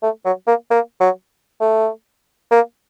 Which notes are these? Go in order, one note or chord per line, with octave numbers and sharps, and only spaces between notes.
A3
F#3
A#3
A#3
F#3
A3
A#3